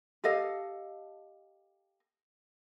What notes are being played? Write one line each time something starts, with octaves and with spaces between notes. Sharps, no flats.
G4 A4 D#5 F5